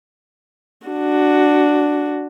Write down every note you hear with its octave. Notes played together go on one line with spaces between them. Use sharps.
D4 F#4